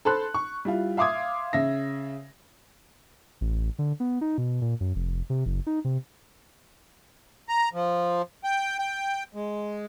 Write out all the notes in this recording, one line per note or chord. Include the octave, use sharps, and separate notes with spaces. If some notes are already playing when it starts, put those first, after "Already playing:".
A4 C5 A5 B5 C6 F#6
C#6
G3 E4 F4
E5 F5 C6 D6 D#6 G#6
C#3 E5 A#6
A1
D3
B3
D#4
B2
A#2
F#2
F1
C3
F#1
D#4
C3
A#5
F3
G5
G5
G#3